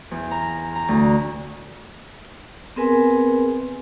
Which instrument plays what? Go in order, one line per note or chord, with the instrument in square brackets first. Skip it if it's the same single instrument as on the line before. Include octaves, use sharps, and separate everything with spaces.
[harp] E2
A#5
A#5
D2
[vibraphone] B3 C4 G#4 A#4 B4 G#5